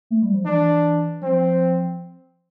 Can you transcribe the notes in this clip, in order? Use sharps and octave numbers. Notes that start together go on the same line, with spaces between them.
A3
G3
F3
E3 D4
F3 C4